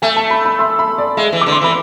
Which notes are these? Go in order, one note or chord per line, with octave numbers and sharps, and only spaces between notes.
A3 G#5
A5
B5
B5
C6
B5
D5
G#3 E5
E3
D3 D6
C6
E3 B5